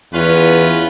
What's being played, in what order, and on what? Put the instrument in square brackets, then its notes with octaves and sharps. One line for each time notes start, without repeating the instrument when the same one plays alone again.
[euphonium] E2 [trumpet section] C#4 F4 B4